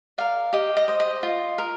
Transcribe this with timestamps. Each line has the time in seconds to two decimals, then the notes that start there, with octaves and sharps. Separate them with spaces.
0.18 A#4 D5 F5
0.53 G4 D#5
0.77 D#5
0.88 C5 D#5
1.00 D#5
1.23 F4
1.58 A#4